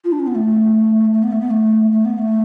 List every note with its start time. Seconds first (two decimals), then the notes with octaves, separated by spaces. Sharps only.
0.04 F4
0.12 D4
0.19 C#4
0.27 B3
0.35 A3
1.13 A3
1.22 B3
1.32 A3
1.41 B3
1.50 A3
1.92 A3
2.05 B3
2.18 A3